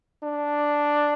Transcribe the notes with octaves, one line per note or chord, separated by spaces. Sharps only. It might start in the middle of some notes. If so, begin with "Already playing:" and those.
D4